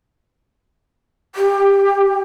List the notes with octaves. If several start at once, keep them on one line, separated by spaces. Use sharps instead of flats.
G4